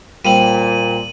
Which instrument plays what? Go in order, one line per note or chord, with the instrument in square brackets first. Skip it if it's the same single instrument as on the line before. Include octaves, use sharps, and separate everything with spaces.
[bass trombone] A#2 [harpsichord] G3 A#3 C4 [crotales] D#7 F#7